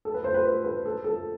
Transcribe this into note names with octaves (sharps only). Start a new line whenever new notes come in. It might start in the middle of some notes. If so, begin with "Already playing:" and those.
A4
B4
C5
B4
B4
B4
A4
A4